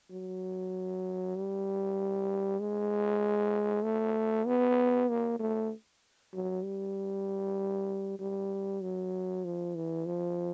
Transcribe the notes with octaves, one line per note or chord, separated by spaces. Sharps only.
F#3
G3
G#3
A3
B3
A#3
A3
F#3
G3
G3
F#3
F3
E3
F3